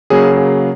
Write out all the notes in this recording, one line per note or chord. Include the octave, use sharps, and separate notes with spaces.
C#3 F#3 A#3 G#4
G#4